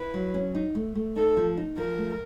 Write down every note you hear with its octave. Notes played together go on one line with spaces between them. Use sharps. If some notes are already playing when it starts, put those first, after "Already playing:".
Already playing: E4 B4
F#3
C#4
D#4
A3
A3
D#4 A4
F3
D#4
F3 A#4
A3